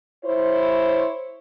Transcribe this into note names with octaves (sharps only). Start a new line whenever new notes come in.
E4 C5 C#5